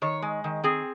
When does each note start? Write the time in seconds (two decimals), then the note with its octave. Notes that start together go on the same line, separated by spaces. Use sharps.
0.02 D#3 C#5
0.22 G#3
0.44 D#3
0.64 C4 G#4